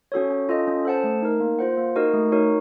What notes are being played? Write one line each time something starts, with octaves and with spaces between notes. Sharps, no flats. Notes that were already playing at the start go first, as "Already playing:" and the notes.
C#4 F#4 A4 C#5
C#4
F4 A4 D#5
C#4
A4 C5 F#5 A5
A3
D#4 A#4
A#3
F4 C5 F#5
A#3
D#4 F#4 A#4 D#5
A3
D#4 F#4 A#4 C#5